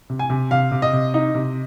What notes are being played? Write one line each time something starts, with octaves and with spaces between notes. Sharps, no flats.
C3
G#5
C3
C3 F5
C3
D#5
C3
D#4 D#5
C3